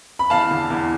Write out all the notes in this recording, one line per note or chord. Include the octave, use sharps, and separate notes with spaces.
B5
E2 F5 A5
D3
E2